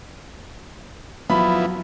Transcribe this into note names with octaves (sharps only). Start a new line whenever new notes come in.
F3 F#3 B3 E4 B5